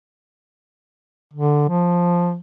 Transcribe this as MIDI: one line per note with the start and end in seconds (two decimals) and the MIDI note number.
1.33 1.66 50
1.68 2.39 53